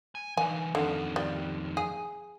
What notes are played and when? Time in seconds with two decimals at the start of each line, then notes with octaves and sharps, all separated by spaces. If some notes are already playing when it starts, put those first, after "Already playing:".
0.15 G#5
0.37 E3 D#4 G#5
0.75 F2 D3 D#3
1.16 G3
1.77 G#4